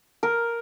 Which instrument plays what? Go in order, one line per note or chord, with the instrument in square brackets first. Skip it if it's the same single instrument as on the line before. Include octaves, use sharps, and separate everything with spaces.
[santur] A#4